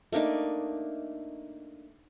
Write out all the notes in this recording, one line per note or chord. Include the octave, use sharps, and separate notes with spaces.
A3 A#3 D4 D#4